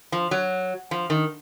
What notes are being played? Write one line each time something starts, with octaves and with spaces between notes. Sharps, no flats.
F3
F#3
F3
D#3